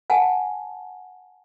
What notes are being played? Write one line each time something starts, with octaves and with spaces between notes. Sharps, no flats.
F#5 G#5 A5